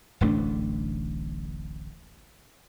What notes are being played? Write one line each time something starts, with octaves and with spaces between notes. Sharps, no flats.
D1 A1 A3 D4